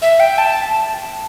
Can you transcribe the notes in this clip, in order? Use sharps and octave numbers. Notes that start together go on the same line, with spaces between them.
E5
G5
A5